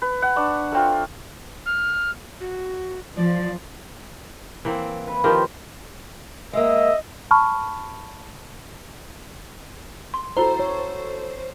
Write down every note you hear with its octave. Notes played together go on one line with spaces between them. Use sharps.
B4
F#5
D4 C#6
A3 C4 F4
F6
F#4
F3 D5
E3 A#3 C4
B4
D#3 F3 G4 A#4
G#3 A#3 D#5 E5
A5 B5 C#6 F6
C6
E4 F#4 A4 C5 A#5
C#5